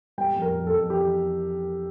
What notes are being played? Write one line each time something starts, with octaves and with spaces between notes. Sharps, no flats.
G3 G5
F2
A#4
F2
A4
F2
E3 G4